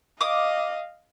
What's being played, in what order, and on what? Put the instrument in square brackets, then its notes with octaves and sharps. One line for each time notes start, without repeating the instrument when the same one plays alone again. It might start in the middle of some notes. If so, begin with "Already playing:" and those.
[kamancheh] D#5 F5 [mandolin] D6 D#6